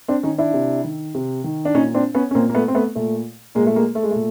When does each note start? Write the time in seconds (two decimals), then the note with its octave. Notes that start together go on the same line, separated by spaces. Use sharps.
0.08 C4 D4
0.23 D#3 C#4 D#4
0.38 D4 E4
0.53 C3
0.84 D#3
1.15 C3
1.44 D#3
1.65 D4
1.74 A#2 C#4 D#4
1.94 C4 D4
2.15 B3 C#4
2.31 C#4
2.35 A#2 A#3 C4
2.50 A#3
2.55 A3 B3
2.68 C4
2.75 A3 B3
2.95 A#2 A3
3.55 A#2 G#3 A#3
3.66 A3
3.75 G#3 A#3
3.95 A3
4.03 G#3
4.11 A#2 A3